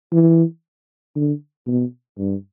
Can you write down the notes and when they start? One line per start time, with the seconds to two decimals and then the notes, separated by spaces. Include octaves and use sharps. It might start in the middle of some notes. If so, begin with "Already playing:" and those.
0.13 E3
1.16 D3
1.67 B2
2.18 G2